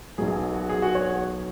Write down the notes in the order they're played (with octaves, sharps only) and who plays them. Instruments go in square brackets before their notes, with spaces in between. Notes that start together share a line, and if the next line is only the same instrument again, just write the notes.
[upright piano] B1 B2 F#3 G#4
F#4
G#4
F#4
C#5